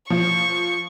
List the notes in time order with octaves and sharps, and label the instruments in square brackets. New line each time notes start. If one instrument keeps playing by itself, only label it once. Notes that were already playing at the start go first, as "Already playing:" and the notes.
[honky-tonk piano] F3 [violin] C#6